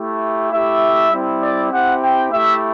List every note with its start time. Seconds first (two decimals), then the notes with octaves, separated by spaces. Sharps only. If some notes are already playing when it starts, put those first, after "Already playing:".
Already playing: A3 E4 G4
0.49 A3 E4 G4 E5
1.10 G3 C4 E4
1.41 D5
1.71 C4 E4 G4 F#5
2.01 G5
2.30 A3 E4 G4 E5